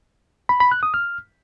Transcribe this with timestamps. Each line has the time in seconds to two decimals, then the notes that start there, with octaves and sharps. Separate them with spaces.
0.49 B5
0.60 B5
0.72 F#6
0.83 D#6
0.94 F6